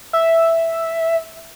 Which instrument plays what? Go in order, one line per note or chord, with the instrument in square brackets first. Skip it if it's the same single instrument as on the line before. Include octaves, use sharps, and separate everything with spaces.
[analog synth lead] E5